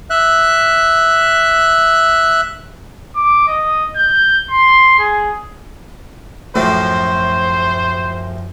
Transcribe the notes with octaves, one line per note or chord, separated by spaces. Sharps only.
E5 F#6
D6
D#5
G6
C6
G#4
F#2 A2 F3 A3 C5